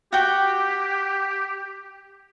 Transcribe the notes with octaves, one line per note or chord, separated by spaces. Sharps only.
F#4 G4 G5